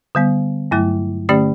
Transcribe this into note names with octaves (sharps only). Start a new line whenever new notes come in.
D3 G3 B3
G2 F#3 A3 E4
D3 A3 C#4 G4 D5